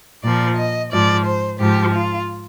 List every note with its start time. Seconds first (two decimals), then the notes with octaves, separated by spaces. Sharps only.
0.24 A#2 F3 D5
0.58 D#5
0.93 G#2 F3 D5
1.27 C5
1.60 G#2 F3 G4
1.95 F4